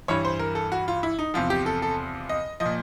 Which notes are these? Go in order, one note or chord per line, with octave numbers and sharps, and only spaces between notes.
G2 E3 C#5
C5
A#4
A4
F#4
F4
E4
D#4
E2 C3 F3 F4
G4
A4
A4
D#5
F3 D#5
A#2